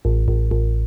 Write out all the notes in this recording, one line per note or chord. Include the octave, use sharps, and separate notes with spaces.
A1
A1
A1